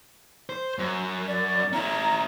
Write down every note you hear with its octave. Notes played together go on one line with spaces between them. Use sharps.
C5
F#2
D5
C#4 E4 A#5